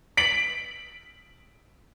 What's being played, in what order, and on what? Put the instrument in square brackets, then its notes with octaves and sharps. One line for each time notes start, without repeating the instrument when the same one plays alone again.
[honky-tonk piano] B6 D7 F#7